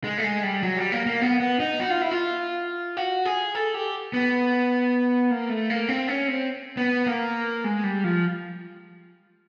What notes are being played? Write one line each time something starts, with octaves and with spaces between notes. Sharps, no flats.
G#3
A3
G#3
G3
F#3
G3
A#3
A#3
B3
B3
D#4
F#4
F4
E4
F4
F#4
G#4
A4
G4
B3
A#3
A3
A#3
C4
C#4
C4
B3
A#3
G#3
G3
F3